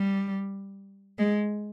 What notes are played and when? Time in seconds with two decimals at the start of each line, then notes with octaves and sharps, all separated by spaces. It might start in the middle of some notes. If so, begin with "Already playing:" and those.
Already playing: G3
1.18 G#3